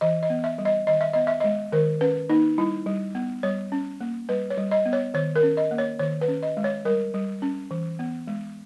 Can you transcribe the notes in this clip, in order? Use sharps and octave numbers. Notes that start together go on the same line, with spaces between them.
E3 D#5
D#5
B3
E5
G3
D#5
D#3 D#5
E5
B3 D#5
E5
G#3 D#5
D#3 A#4
C#4 B4
A#3 D#4
G3 E4
G3
B3
G3 C#5
C#4
A#3
G3 B4
C#5
G3
D#5
B3
C#5
D#3 C#5
A#4
C#4
D#5
A#3
C#5
D#3 C#5
B4
C#4
D#5
G#3
C#5
G3 A#4
G3
C#4
E3
B3
G#3